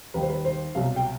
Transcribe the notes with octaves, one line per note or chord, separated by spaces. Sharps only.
D#2 D#3 G3 B4
C5
B4
C5
C2 B2 F#3 F5
G5